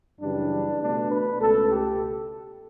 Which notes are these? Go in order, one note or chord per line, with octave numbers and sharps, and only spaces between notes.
F#2 C#3 E3 G3 D4
B2 A3 D4
B4
C#2 B2 A3 A4
G4